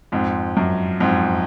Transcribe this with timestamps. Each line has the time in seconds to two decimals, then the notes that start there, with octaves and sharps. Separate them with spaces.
0.12 F2 G#2
0.57 F#2
1.00 F2 G#2